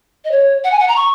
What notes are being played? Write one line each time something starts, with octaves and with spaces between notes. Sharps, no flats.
D#5
C#5
F#5
G#5
F#5
A#5
C#6